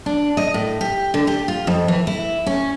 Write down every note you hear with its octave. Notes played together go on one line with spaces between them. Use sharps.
D4
D#5
A2
G4
D3
G4
F4
F2
E3
E4
C#4